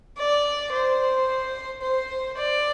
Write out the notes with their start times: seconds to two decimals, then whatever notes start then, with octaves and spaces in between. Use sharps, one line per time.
0.18 D5
0.72 C5
1.82 C5
2.37 D5